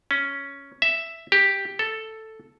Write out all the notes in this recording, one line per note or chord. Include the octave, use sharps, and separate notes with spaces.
C#4
E5
G4
A4